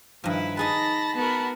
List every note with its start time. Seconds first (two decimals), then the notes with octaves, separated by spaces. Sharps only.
0.24 G2 D#3 F3 E4 B4
0.57 D#4 G#4 B4 A5 B5 A6 A#6
1.15 B3 F#4 A#4 A5 B5